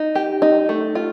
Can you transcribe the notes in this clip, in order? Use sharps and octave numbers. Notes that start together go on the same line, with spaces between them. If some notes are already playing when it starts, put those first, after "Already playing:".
Already playing: D#4
G4
D#4
A3
F4